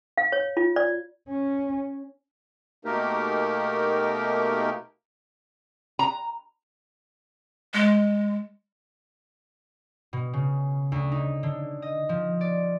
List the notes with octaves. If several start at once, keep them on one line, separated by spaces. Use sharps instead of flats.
F5
C#5
F4
D5
C#4
B2 A3 A#3 D#4 G4 A#4
A#5
G#3
B2
C#3
D2
D#4
D3
D#5
F3
D5